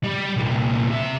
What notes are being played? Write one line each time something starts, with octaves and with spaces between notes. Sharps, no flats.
G3 G4
C2 A#2
C3 E5